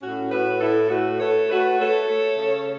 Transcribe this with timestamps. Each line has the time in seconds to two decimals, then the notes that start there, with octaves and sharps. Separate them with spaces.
0.02 A2 C#4 F#4
0.31 A2 F#4 B4
0.60 A2 E4 A4
0.90 A3 F#4 B4
1.20 A3 A4 C#5
1.50 A3 F#4 B4
1.79 A3 A4 C#5
2.08 A3
2.38 C#3